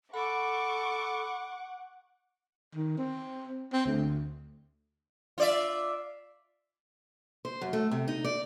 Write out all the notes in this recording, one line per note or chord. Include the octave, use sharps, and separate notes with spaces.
A4 F#5 B5 C#6 D6
D#3
C4
C4
D2
F4 D5 E5
C5
F#2
A3
C3
D#4
D5